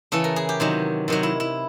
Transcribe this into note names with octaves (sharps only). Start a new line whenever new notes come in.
C#3 E3 A4
A#4
G#4
G4
C3 D#3 F#3
C3 D#3 F#3
E4
E4